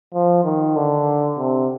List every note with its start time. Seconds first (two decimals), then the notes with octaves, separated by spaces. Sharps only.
0.14 F3
0.44 D#3
0.76 D3
1.38 C3